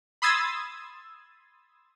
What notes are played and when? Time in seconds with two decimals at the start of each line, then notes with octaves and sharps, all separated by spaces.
0.22 B5 C6 D#6 E6 G#6 A6